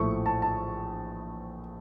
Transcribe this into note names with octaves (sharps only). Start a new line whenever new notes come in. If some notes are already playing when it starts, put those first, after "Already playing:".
Already playing: A#1 A2 F3 A3 C#6
A5
A5